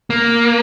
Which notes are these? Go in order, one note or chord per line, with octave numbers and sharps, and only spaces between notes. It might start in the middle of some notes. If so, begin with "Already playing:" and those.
A#3